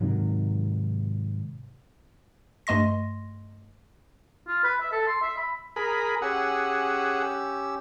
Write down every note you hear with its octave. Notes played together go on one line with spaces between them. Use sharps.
G#2 C3 D#3 F#3
G2 A3 D#5 C6 A#6
F4
B4
E5
A4
C6
E5
B5
G#4 A#4 B5
C#4 G4 G#4 F#5 E6